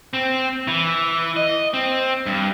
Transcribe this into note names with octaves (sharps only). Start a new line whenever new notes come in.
C4
E3
D#5
C4
G2